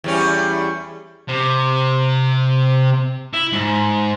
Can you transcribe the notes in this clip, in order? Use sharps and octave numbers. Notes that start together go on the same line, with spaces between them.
E2 G3 C#4
C3
E4
G#2